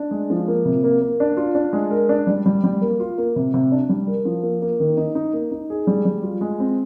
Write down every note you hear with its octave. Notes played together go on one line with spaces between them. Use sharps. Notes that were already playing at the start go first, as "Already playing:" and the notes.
Already playing: D4
G#3
F3
A#3
C3
A#3
A#3
D4
F4
D4
G#3
A#4
D4
G3
G3
G3
A#3
F4
A#3
C3
C3
D4
G3
A#4
F3
A#3
A#3
D#3
D#4
D#4
A#3
D#4
G#4
G3
G3
F4
G#3
C4